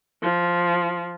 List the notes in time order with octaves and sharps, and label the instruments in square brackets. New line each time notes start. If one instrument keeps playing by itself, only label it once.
[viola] F3